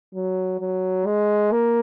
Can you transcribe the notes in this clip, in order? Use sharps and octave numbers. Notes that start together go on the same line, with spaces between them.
F#3
F#3
G#3
A#3